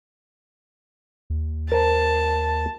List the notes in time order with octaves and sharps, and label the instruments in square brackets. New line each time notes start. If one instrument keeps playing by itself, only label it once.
[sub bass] D#2
[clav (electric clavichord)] A#4 C5 [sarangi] A5